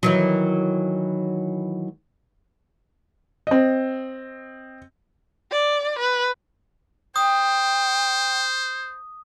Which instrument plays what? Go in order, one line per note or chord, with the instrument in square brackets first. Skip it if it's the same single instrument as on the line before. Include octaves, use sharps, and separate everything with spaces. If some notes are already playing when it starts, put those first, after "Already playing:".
[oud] D#3 E3 F#3
[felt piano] C4 D#5
[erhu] D5
B4
[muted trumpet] C5 [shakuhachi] G5 [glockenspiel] D#6